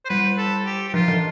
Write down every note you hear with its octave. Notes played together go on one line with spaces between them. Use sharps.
C5
G3 B4
A4
G4
G4
F3 F4
E3